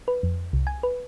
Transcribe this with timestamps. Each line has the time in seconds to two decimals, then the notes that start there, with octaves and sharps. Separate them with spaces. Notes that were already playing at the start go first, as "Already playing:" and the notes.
0.08 B4
0.23 F2
0.53 C2
0.67 G#5
0.83 B4